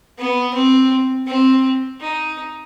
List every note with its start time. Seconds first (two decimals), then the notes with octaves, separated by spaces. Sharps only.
0.18 B3
0.54 C4
1.27 C4
2.01 D#4